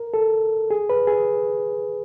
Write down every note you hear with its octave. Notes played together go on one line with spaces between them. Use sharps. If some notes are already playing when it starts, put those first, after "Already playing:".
Already playing: A#4
A4
G#4
B4
G#4